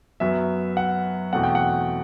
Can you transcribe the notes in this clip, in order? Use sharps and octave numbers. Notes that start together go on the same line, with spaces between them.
F#2 F#3 B3 E5
F#5
E2 B2 A3 C4 F#5
G5
F#5